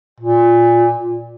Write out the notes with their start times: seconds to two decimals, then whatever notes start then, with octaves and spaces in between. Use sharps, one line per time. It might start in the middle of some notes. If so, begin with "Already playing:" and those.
0.20 A#2